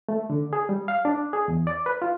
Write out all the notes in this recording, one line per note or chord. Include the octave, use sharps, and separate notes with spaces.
A3
D3
G#4
G3
F5
D4
G#4
E2
D5
B4
F4